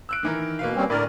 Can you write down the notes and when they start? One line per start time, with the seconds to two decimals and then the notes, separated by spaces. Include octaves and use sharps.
0.09 E6 F#6 D7
0.23 D#3 E3 A#4
0.59 B2 A#3 B4 F5
0.76 G3 C4 C#4
0.90 A2 D3 A#4 D5 F6